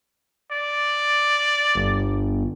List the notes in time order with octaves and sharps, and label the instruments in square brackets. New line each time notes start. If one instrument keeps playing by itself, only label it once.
[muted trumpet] D5
[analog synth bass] G1